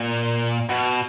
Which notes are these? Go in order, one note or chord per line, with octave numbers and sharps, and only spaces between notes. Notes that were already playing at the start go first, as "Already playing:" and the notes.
Already playing: A#2
B2